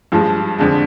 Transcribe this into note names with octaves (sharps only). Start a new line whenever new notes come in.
G2 F3 G#3
F2 D3 G#3